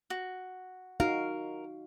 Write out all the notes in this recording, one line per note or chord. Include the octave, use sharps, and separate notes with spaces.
F#4
D#4 F#4 A#4 F5